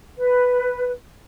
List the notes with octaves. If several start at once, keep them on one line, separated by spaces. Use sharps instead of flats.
B4